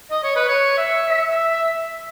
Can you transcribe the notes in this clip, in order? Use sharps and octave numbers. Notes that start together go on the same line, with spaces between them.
D#5
C#5
B4
C#5
E5
E5